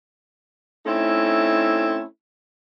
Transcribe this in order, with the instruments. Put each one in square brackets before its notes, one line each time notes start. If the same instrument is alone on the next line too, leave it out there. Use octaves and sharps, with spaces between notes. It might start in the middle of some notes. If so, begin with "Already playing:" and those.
[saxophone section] A3 C4 C#4 D#4 E4